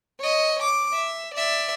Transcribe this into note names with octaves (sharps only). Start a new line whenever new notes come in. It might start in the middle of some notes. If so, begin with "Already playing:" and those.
C#5 D#5
D6
E5
D5 E5